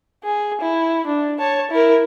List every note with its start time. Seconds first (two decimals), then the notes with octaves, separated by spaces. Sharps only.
0.24 G#4
0.60 E4
1.06 D4
1.39 C#5 A5
1.71 E4 A#4